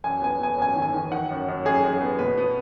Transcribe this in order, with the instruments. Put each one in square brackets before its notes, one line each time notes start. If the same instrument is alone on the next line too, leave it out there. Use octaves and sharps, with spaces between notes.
[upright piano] F#2 G#5
B3 G#5
B3 G#5
F#2 G#5
D#3
G#5
D#3
D#3 F#5
F#2
F#2
F#2 G#4
F#2
G#4
B3
B2 B4
B3